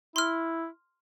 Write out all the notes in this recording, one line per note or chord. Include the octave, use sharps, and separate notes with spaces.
E4 C6 F6